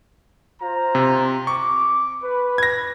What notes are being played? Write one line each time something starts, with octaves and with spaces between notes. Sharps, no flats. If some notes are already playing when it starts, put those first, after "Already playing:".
F4 C5 A#5
C3
C#6 D6
B4
G#6 A#6